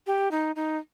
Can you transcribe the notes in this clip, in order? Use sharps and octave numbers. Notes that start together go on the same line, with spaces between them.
G4
D#4
D#4